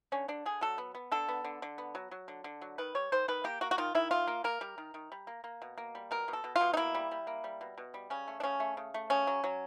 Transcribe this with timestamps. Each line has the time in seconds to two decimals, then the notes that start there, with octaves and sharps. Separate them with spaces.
0.12 D3 C#4
0.28 D3 D4
0.46 D3 G#4
0.61 F#3 A4
0.78 B3
0.95 B3
1.12 D3 A4
1.28 B3
1.44 D3
1.62 D3
1.78 B3
1.95 F#3
2.11 F#3
2.28 D3
2.44 D3
2.61 F#3
2.78 D#3 B4
2.95 G3 C#5
3.12 D#3 C5
3.28 D#3 B4
3.44 A#3 G4
3.61 A#3 F#4
3.71 F#4
3.78 D#3 F4
3.95 D#3 E4
4.11 D#3 F4
4.27 A#3
4.44 A#3 A#4
4.61 G3
4.78 D#3
4.94 D#3
5.12 G3
5.27 A#3
5.44 A#3
5.62 B2
5.78 A#3
5.95 G3
6.11 B2 A#4
6.28 B2
6.33 A4
6.44 B2
6.56 F4
6.61 B2
6.74 D#4
6.77 A#3 E4
6.95 G3
7.11 G3
7.27 A#3
7.44 G3
7.61 B2
7.78 B2
7.94 G3
8.10 C#3 C#4
8.28 A3
8.40 D4
8.43 C#3 C#4
8.60 A3
8.77 C#3
8.94 A3
9.10 C#3 C#4
9.27 F#3
9.44 F#3